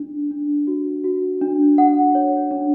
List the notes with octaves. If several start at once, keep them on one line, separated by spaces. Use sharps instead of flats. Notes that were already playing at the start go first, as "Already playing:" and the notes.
Already playing: D4
D4
F#4
F#4
D4
F#5
C#5
D4